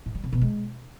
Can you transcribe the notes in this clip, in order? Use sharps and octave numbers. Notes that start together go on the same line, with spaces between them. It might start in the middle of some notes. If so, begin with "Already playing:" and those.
A2
G3
C3
B2
G#3